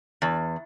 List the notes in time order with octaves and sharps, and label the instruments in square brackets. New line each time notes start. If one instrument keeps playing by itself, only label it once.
[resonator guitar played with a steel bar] E2